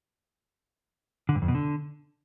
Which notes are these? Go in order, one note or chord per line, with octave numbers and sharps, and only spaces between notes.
D3
G2
F2
B2
D3